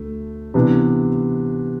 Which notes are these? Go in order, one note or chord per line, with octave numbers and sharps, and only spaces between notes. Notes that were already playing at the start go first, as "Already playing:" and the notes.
Already playing: D2 A3
C3 E3 B3 D4